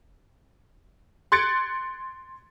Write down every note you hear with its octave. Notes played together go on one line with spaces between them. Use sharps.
C6 F#6 G#6 A6 C#7 D7